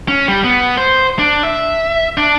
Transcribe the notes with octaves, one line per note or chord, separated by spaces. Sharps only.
C#4
G3
B3
C5
D4
E5
D4